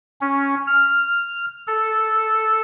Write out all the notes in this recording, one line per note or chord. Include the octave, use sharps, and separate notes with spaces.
C#4
F6
A4